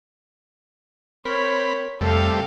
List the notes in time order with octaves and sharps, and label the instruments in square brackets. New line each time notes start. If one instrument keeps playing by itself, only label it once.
[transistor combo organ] C4 B5 [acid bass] A#4 [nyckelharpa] C#5
[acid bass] F2 [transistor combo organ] C3 G3 A3 [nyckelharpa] A4 F5